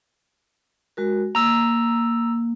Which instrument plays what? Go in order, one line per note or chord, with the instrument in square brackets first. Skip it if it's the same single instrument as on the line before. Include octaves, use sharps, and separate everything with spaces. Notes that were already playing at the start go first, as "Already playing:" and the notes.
[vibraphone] G#3 F#4 A#4
[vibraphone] A#3 [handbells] A#5 E6